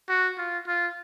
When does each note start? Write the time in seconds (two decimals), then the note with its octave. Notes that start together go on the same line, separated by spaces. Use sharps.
0.09 F#4
0.38 F4
0.68 F4